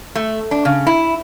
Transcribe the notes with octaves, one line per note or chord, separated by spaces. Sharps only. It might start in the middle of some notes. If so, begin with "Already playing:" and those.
A3
D4
C#3
E4